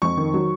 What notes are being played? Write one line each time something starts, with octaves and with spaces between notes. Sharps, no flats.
F2 C#6
D#3
F#3